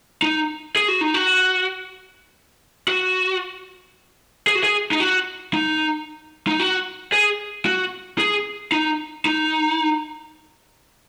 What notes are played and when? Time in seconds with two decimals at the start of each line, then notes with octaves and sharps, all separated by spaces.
0.22 D#4
0.76 G#4
0.88 F#4
1.01 D#4
1.14 F#4
2.88 F#4
4.47 G#4
4.55 F#4
4.63 G#4
4.92 D#4
5.00 F#4
5.54 D#4
6.47 D#4
6.60 F#4
7.12 G#4
7.65 F#4
8.18 G#4
8.72 D#4
9.26 D#4